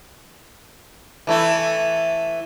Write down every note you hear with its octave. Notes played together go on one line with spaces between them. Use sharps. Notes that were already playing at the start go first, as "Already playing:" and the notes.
E3 A3 E4